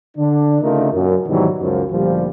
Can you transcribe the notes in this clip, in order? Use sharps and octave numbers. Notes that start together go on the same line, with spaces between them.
D3 D4
C#3 A3 D4 D#4 F4 A#4
F#2 A#2
G#2 B2 D#3 E3 F#3 G3
C#2 F#2 F3
D2 A#2 F3 G3